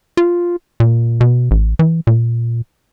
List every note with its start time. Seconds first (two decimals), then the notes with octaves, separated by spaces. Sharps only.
0.17 F4
0.80 A#2
1.21 B2
1.51 A1
1.79 E3
2.07 A#2